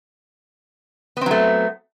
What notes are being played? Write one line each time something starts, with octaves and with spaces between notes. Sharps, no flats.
F#3 A3 B3 C4